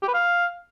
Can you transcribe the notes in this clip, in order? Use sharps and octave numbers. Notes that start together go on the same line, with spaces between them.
G4
B4
F5